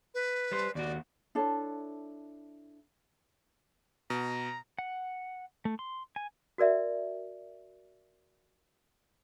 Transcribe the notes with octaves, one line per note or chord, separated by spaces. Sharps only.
B4
G3 C5
D#2 F#4 D5
D4 E4 A4 C#5
B2 A#5
F#5
A3
C6
G#5
F#4 A#4 D5 E5